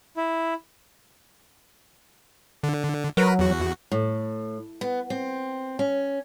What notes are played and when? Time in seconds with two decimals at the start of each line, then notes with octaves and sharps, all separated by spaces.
0.17 E4
2.63 D3
3.17 F#3 A#4 B4
3.39 E2 F#4
3.92 A2
4.81 B3
5.10 C4
5.79 C#4